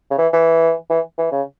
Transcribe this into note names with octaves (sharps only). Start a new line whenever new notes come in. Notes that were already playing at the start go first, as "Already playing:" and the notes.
C#3
E3
E3
E3
E3
C#3